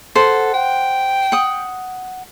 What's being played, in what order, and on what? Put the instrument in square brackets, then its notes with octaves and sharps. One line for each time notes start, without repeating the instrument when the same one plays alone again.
[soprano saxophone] A4 [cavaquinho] C5 F#5
[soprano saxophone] G5
[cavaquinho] F#5 D#6